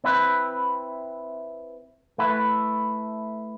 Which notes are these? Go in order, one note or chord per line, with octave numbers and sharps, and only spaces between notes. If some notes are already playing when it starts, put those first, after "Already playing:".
C4 E4 B4
A3 E4 B4